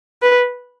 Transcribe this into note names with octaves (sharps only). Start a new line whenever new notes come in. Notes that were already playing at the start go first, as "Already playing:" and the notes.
B4